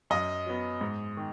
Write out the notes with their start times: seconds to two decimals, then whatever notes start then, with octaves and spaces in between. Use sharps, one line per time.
0.10 F#2 D#5
0.46 F#3 B3
0.81 G#2
1.17 D#3